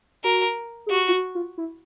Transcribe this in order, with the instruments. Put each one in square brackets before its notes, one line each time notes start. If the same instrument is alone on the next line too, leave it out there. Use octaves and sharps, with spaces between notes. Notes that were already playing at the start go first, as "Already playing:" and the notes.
[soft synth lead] F#4 [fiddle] A#4
[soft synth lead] G#4
[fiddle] F#4 [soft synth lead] G4
[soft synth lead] F4
F#4
F4
E4